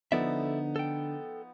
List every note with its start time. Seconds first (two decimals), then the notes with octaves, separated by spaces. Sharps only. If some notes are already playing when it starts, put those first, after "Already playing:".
0.12 D3 F3 B3 D#4 A4 D5 E5
0.76 A4 G5